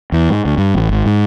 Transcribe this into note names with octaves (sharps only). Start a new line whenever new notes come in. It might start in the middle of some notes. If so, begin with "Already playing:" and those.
E2
G#2
D2
G2
A1
G#1
G#2